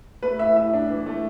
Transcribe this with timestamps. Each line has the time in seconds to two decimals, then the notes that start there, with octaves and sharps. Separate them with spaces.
0.23 A3 B4
0.39 A2 E5
0.56 A2 E5
0.73 D4
0.90 E3
1.06 A3